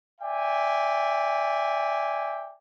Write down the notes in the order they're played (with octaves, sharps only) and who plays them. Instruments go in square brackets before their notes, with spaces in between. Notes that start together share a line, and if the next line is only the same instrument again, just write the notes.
[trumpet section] D5 E5 G5 G#5